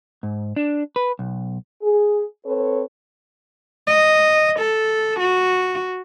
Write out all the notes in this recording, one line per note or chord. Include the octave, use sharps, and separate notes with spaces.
G#2
D4
B4
B1
G#4
C4 A4 B4 C#5
D#5
A4
F#4